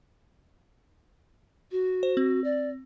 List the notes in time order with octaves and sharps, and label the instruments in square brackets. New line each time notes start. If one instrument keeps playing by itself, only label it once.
[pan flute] F#4
[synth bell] C5
C4
[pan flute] D5